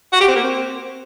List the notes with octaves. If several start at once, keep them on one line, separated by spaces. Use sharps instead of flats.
F#4
G4
C4
A#3
C4